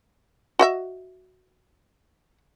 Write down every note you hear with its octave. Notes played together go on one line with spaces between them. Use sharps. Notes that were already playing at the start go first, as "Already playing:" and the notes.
F#4 D#5 E5